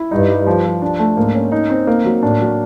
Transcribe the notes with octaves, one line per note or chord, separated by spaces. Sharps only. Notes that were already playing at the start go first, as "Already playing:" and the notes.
Already playing: E4
G2 D#4
G3
F3
F3
D4
A3
G#2 A#3
C#4
D#4
C4
A#3
F#3
A2 D4
F#3